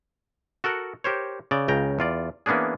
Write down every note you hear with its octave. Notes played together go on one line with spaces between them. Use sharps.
F#4 A4 A#4 F#5
G4 A#4 C5 C#5
C#3 D5
C#2 C#3 G5 A#5
E2 F4 D5
E3 A#3 B3 C#4 D4 G#4